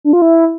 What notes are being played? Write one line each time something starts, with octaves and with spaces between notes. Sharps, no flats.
D4
F4
E4